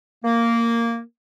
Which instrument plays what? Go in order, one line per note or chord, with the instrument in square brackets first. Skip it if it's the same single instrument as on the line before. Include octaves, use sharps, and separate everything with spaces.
[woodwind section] A#3